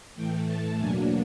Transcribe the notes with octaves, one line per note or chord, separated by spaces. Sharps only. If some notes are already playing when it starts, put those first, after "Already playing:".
A2 E3 A3 G5
A5
E2 B2 F#3 A#3 D4 G#5